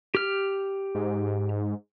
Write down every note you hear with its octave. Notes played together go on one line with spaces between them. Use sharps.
G4 F6
G#2